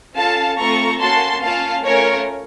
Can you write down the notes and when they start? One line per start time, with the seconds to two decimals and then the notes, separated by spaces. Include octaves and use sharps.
0.16 C#4 F4 A4 F5 A5
0.58 A3 C4 F4 A4 A#5 C#6
1.00 A#3 C#4 F#4 A5 C6
1.42 A#3 C#4 F4 F5 A5
1.84 A3 C#4 F4 A#4 C#5